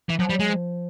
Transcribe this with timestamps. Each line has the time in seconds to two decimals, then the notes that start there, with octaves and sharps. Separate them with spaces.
0.10 E3
0.19 F3 F#3
0.29 G3
0.35 F#3 G#3
0.49 F3